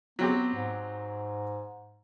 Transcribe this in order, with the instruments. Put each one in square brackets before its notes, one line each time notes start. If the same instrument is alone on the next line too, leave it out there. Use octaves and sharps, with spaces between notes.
[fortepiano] F#3 C4 G4 [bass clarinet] B3
[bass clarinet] G#2